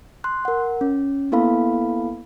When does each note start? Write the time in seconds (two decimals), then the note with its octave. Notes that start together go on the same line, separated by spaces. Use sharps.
0.24 C6 F#6
0.45 A#4 F#5
0.81 C#4
1.32 A#3 B3 E4 A4 F5 B5